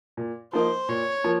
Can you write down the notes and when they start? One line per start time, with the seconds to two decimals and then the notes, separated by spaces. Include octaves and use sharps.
0.17 A#2
0.53 F3 A#3 D#4 C5
0.89 A#2 C#5
1.24 F3 A#3